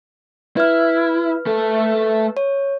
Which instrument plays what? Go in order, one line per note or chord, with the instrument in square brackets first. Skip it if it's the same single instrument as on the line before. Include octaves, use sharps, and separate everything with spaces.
[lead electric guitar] E4 [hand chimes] B4 F6
[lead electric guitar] A3 A4
[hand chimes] C#5